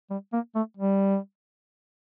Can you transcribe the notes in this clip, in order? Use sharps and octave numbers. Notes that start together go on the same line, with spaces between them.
G3
A#3
A3
G3